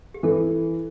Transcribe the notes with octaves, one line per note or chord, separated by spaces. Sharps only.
G4
E3 A4